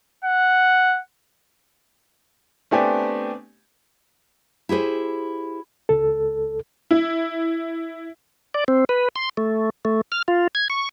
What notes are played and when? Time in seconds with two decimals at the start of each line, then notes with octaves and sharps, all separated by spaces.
0.24 F#5
2.71 A3 B3 C4 D4 G4 G#5
4.69 E4 G4 G#4 C5
5.89 C#2 A4
6.91 E4
8.54 D5
8.68 C4
8.89 B4
9.16 C6
9.37 A3
9.85 A3
10.12 F6
10.28 F4
10.55 G#6
10.70 C#6